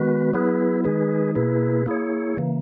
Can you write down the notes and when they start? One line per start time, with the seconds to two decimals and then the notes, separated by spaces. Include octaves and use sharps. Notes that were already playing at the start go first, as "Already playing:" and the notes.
Already playing: D#3 G#3 B3 F#4 B4
0.34 F#3 B3 E4 G#4 B4
0.84 D#3 G#3 D#4 G#4 B4
1.35 B2 A#3 E4 G#4 B4
1.86 A#3 E4 G#4 C#5
2.37 C#3 E3 A#3